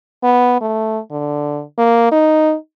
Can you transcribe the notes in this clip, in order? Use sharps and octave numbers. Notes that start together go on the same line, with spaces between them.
B3
A3
D3
A#3
D#4